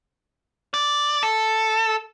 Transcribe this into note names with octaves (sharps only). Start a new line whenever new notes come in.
D5
A4